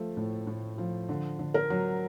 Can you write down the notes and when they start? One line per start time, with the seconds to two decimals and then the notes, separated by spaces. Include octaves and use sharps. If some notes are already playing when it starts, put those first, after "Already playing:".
Already playing: F3 A3
0.17 A2
0.47 A2
0.78 F3
1.09 D3
1.39 D3
1.54 A#4
1.70 F#3